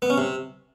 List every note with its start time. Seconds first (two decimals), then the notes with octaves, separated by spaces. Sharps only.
0.02 B3
0.10 C#4
0.18 C3